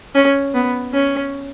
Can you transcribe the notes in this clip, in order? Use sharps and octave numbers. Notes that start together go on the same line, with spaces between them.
C#4
B3
C#4